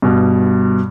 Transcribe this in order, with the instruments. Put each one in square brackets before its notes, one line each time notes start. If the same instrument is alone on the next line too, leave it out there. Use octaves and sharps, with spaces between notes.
[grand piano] G2 B2